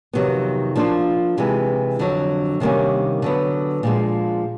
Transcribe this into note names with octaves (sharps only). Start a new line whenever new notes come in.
F2 C3 D#3 F#3 B3
F3 A#3 D4 F4
C3 E3 G#3
F2 D3 F#3
C3 D#3 G3 A#3 C#4
D3 F#3 B3
A#2 F3 G#3